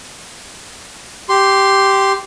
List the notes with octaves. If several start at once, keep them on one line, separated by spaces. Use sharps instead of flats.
G4 C6